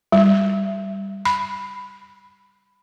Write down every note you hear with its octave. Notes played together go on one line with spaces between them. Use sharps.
G3
B5